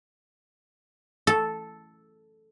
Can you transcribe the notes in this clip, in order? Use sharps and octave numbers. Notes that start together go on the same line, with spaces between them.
A4